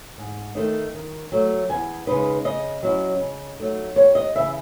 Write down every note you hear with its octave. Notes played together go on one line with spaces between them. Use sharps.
G#2
D#3 A3 D#4
D#3
F#3 A3
E2 G#5
C#3 G#3 D#4 B4
C#3 D#5
F#3 C#4 E4
C#3
F#3 A3 D#4
D#2 C#5
D#5
C#3 E3 E5